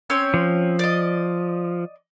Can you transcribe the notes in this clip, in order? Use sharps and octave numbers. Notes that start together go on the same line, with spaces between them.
C4 C#4 C#5
F3
D5 D#5